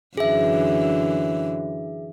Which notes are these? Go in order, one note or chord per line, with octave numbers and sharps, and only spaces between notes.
F#2 D3 E3 G#4 E5